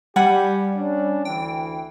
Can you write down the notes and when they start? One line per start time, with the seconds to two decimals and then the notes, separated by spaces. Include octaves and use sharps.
0.16 G3 G4 F#5 G#5 B5
0.77 C#4 D4
1.25 D2 E3 G5